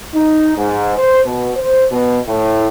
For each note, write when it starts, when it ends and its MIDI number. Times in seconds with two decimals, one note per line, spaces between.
0.15 0.53 63
0.58 0.95 44
0.97 1.21 72
1.26 1.50 47
1.56 1.86 72
1.92 2.19 47
2.27 2.68 45